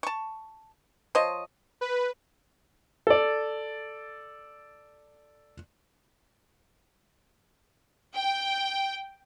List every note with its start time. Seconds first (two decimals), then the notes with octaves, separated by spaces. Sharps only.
0.03 A5 C#6
1.15 F3 C5 C#5 D#5
1.81 B4
3.07 A4 D5
8.14 G5